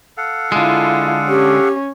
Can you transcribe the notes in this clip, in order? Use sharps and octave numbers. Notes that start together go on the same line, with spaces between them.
A4 F5 F#5
D3 G#3 E4 F4
C#4 G4